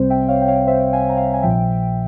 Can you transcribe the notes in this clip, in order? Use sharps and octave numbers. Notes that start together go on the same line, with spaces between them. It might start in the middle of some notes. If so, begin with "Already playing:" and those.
Already playing: C2 C3 G3 C4 C5
E5 G5
C#5 F5
G5
C#5 F5
C5 E5
F5 G#5
A#5
F5 G#5
G#5
A#1 A#2 F3 E5 G5